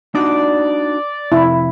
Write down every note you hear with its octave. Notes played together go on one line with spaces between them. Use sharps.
D4 D#4 F#4 D5
F2 C3 E4